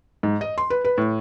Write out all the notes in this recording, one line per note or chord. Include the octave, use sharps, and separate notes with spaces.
G#2
D#5
C6
B4
B4
A2